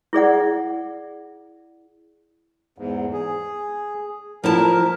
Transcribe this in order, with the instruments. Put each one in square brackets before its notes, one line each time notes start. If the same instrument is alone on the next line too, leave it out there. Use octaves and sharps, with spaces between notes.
[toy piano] E4 G#4 D5 F#5
[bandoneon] E2 G#2
G#4
[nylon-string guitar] F3 E4 A5 [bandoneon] A#4